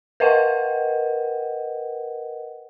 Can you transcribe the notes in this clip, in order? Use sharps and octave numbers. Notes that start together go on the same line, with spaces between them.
A#4 B4 D#5 F#5 G5